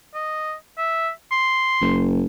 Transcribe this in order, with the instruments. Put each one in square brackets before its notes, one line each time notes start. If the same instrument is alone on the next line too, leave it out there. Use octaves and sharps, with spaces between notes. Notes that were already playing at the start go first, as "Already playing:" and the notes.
[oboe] D#5
E5
C6
[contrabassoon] F#1